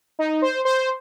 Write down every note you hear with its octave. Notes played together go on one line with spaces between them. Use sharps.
D#4
C5
C5